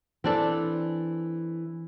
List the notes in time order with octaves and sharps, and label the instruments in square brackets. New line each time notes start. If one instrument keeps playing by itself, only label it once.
[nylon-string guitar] E3 [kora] C4 D4 A4